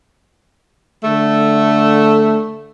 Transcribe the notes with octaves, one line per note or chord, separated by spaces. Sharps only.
D3 A3